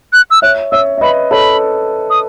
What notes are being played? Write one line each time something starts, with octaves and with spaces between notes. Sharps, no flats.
F#6
E6
C#5 E5 F#6
C#5 E5 E6
E5
B4 D#5 B5
A4 C#5 B5
D#6